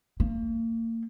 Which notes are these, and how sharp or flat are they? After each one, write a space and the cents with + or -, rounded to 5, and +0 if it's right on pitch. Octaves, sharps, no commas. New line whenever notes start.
A#3 -40